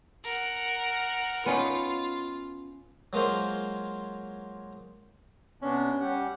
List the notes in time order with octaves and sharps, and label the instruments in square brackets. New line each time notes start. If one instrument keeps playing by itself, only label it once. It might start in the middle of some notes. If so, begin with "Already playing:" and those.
[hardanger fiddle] A#4 F#5
[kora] B3 C#4 D#4 [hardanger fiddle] F4
[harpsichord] F#3 G#3 A#3 F4 C5
[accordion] C3 B3 D4 [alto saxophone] C#4
[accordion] G3 G4 F#5